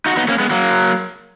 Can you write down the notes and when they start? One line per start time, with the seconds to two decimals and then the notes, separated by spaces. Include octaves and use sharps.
0.06 D#4 F#4
0.17 B3 D#4
0.28 A#3 C#4
0.39 G#3 B3
0.51 F#3 A#3